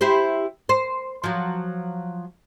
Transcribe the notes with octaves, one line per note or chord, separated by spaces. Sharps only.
E4 G4 C5
C5
F3 F#3